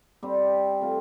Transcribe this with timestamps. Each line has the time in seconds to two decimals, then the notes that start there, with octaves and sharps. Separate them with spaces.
0.23 G3 C4 G4
0.81 A3 C4 F4